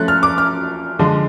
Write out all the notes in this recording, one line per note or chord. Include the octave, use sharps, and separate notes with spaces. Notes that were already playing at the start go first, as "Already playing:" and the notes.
Already playing: F3 A3 C#4 F#6 A6
F6
D6
F6
D3 F3 G#3